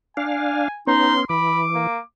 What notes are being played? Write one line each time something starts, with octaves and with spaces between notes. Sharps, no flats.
D4 F5 G#5
B3 C#4 D#4 C6
E3 B5 D6
A#3